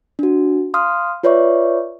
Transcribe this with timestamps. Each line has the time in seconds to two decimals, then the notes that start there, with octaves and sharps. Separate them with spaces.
0.19 D4 F#4
0.74 F5 C6 D#6 F6
1.23 F4 B4 C#5 D5 E5 C#6